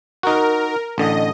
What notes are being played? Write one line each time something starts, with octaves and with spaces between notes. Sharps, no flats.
D#4 F#4 A#4
A1 D3 D#5